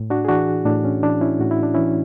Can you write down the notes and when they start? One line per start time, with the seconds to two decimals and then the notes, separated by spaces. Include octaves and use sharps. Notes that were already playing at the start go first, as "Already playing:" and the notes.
Already playing: A2
0.10 D4 F#4
0.25 G#4
0.28 E3 D4 F#4
0.65 A2 D4
0.85 C#4
1.03 E3 D4
1.21 C#4 E4
1.40 A2 F#4
1.51 E4
1.63 D4
1.74 E3 C#4 E4